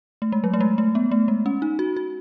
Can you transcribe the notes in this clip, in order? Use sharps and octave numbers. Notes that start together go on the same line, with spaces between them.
A3
G#3
F#3
A3
G#3
A3
B3
A3
G#3
C#4
D#4
F#4
F#4